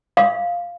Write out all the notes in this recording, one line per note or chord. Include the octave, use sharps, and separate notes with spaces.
F5